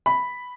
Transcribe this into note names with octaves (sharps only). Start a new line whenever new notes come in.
B5